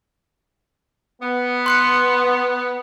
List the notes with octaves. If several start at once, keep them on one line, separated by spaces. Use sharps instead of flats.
B3
C6 F#6 C#7